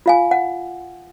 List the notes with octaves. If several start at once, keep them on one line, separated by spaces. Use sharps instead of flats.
F4 F5 G#5
F#5